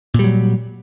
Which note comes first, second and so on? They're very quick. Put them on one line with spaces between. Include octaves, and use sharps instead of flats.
A#2 G3 F#3